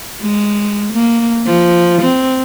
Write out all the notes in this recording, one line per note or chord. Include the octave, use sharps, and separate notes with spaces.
G#3
A#3
F3
C4